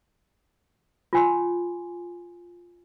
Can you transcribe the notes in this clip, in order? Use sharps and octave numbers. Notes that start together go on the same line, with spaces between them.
F4 G#5 C6